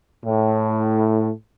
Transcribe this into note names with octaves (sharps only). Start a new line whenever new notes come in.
A2